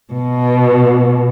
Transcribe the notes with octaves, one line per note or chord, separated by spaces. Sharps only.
B2